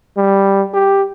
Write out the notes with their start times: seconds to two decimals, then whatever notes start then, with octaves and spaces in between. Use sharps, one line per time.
0.17 G3
0.74 G4